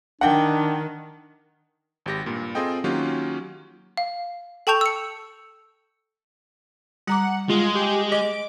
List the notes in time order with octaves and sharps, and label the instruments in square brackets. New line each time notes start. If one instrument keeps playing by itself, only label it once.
[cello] D#3 [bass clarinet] D4 [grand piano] F#5 G5
[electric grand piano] G#1 G4 A#6
G2 A#2
C4 F4 G#4 A4 D#5 G5
D#3 F#3 A#3 C#4 F4 G4
[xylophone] F5
A4 G5 A5 C#6 G6 F7
E6 C#7
[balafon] G3 A#5 D6 [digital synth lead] F#5
[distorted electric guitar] G#3 [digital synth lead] F4
[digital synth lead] G4
[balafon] D#5 [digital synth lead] D6